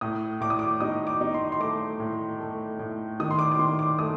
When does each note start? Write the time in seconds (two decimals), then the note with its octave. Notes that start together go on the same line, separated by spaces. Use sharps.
0.01 A2 D#6
0.41 A2 D6
0.50 D#6
0.59 D6
0.80 D#4 D#6
1.07 D6
1.21 D#4
1.34 C6
1.52 C6
1.60 A3 D6
2.00 A2
2.40 A3
2.79 A2
3.20 D#3 D#6
3.31 C6
3.39 D6
3.52 D6
3.59 D#3 C6
3.79 D6
3.99 A3 D#6